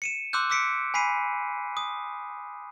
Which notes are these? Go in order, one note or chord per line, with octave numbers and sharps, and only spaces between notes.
C#7 D#7 E7
C6 D6 E6 F#6 G6
D6 E6 B6 C#7 D7
G#5 B5 B6 C7 D#7
D#6